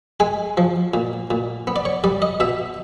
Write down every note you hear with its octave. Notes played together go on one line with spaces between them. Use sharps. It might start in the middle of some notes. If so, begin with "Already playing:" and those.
G#3 G#5
F3
A#2
A#2
B3
D5
C#5
G3 D5
D#5
B2 E5